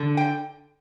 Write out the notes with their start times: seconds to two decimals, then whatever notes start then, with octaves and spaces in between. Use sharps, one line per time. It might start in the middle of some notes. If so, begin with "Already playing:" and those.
Already playing: D3
0.17 G5